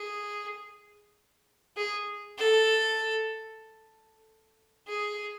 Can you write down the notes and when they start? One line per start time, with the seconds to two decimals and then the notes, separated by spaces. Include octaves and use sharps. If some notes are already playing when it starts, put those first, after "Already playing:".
Already playing: G#4
1.77 G#4
2.38 A4
4.88 G#4